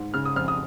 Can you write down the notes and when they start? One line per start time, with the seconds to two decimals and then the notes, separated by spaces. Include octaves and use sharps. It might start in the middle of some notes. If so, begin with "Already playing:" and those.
Already playing: G#2
0.14 C#3 F6
0.25 D#6
0.36 F2 F6
0.48 D#6